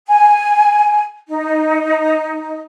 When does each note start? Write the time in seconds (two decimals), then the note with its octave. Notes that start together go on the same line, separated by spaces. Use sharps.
0.07 G#5
1.28 D#4